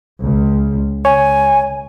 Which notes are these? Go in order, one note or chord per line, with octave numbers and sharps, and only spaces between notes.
C#2
C#2 C#5 G#5